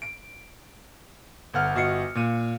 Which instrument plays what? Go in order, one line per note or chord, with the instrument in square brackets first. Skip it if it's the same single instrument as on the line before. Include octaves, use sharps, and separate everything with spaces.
[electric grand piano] D7
G1 A4 F#5 F6
G1 F#4 D#5 C7 C#7
A#2 D#7